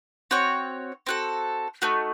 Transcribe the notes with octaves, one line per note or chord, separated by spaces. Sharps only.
C4 F#4 C#5
C4 F#4 A4
A3 D#4 F#4